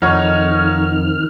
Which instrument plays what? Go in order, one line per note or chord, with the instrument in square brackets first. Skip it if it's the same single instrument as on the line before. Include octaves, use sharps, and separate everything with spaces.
[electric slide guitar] F2 [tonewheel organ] D#3 F6 [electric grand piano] D#4 C#5 [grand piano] D#5 F#5